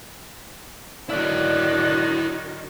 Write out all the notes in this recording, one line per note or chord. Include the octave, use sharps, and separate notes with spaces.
D3 D#3 F#3 E4 C#5 D5 F#6